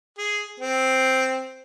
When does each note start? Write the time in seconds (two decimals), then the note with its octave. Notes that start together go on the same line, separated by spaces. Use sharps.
0.18 G#4
0.60 C4